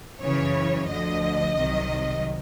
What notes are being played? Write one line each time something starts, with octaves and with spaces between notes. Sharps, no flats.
F#2 C#3 E3 C#5
D2 D3 F3 D#5
C2 C3 D#3 F#3